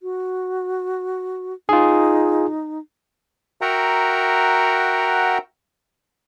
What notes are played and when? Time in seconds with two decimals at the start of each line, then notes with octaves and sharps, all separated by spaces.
0.03 F#4
1.69 D#4 F4 G#4
3.61 F#4 A#4 E5 F#5 G5 A#5